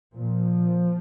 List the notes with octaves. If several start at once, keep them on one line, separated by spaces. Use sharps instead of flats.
A#2 F3